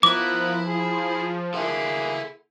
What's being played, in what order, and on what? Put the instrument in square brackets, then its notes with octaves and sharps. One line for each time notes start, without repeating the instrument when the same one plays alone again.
[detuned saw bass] F3 [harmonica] B3 A#4 B4 [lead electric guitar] E4 [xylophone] D6
[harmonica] G#4
[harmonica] A#3 E4 G#4 [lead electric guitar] A4 F#5